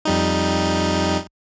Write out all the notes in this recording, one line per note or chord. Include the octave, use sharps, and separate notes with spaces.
F2 G3 D#4